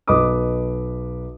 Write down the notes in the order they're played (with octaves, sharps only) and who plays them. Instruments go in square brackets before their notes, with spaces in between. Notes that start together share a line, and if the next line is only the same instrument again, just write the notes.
[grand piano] B1 B4 D#5 D6 D#6